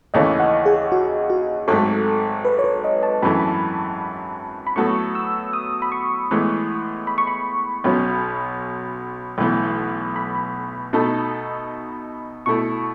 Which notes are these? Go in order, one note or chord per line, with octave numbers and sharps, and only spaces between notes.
D#2 C#3 E3 A3 C#4 D#5
F#5
G#4
F#4
F#4
G#1 G#2 F#3 A3 A4
B4
C#5
B4
D#5
A5
G#1 F#2 E3 A3 B5
A5
B5
B5
A2 F#3 B3 F#4 A4 C#6
E6
D#6
B5
C#6
A2 E3 G#3 B3
B5
C#6
B5
B1 B2 F#3 C#4
B1 A2 E3 B3
B5
B2 A3 D#4 A4
B2 A3 E4 C#6